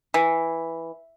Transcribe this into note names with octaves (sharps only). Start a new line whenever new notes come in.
E3